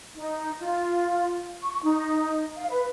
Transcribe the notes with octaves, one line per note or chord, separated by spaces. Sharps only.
D#4
F4
C#6
D#4
F5
B4